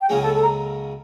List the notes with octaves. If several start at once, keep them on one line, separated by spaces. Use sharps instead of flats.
G5
C#2 C#3 F#3 A#3 G#4 G#5
A4 A5
A4 A5
A#5